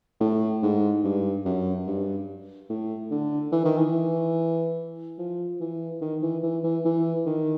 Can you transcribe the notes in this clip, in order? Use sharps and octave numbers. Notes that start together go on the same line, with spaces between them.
A2
G#2
G2
F#2
G2
A2
D3
E3
D#3
E3
F3
E3
D#3
E3
E3
E3
E3
D#3